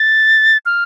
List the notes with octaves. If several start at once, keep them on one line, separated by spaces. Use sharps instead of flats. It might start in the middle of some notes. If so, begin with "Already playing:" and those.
Already playing: A6
F6